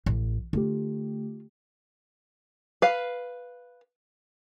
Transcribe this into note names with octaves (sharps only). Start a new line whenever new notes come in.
A1
D3 A3 F4 G4
B4 F5